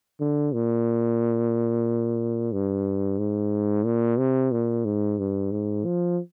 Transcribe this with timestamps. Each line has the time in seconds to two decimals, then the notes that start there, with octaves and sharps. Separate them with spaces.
0.21 D3
0.54 A#2
2.53 G2
3.19 G#2
3.85 A#2
4.19 C3
4.52 A#2
4.85 G#2
5.19 G2
5.52 G#2
5.85 F3